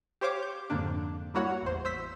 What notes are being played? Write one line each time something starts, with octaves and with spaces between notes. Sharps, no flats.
G4 C5 C#5 F5 D6
G6
F2 G#2 D3 A#3 D4
G3 A#3 E4 F#4 C#5 F#5
A1 E2 C5
C5 E6 B6